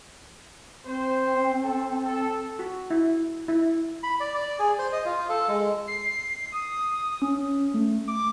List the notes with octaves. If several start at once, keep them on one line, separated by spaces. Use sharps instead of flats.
C4 C5
A4
A4
F#4
E4
E4
B5
D5
D5
G#4
C5
D#5
F4
A4
G#3
C7
D#6
C#4
A3
D6